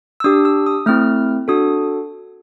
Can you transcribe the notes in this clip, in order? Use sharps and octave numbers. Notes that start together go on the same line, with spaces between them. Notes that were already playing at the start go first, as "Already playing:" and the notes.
E6
D4 G4 D#6
E6
D#6
A3 C4 E4 F6
D4 F#4 A4 D#6